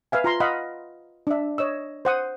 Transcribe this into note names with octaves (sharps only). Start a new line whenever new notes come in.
B4 E5 F5 G#5
F4 A#5 C6
D#5 F5 F#5 B5
D4 E5
C#5 D#5 E6
C5 F#5 D#6